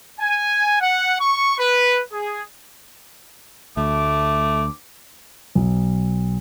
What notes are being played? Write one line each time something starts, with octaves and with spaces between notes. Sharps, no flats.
G#5
F#5
C#6
B4
G#4
D2 A3 D6
B1